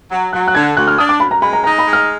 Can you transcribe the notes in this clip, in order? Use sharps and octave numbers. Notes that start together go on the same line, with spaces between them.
F#3
F#3 F#6
F#6
D3 G#6
D2 F#6
F6
D4 D#6
D6
F#2 B5
A#5
G#3 B5
A#5
D#4 A#5
B5
G#3
F6